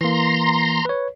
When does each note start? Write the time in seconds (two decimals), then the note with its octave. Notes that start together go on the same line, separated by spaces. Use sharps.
0.01 E3 A#3 A#5 C6
0.85 B4 C#5